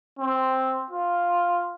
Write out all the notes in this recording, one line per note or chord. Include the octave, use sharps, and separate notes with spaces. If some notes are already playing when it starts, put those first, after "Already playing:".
C4
F4